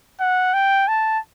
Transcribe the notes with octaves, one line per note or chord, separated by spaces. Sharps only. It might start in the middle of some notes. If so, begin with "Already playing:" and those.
F#5
G5
A5